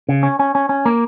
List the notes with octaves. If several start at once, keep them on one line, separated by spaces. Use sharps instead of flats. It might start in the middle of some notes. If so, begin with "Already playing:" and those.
C#3
C#4
C#4
C#4
C#4
A#3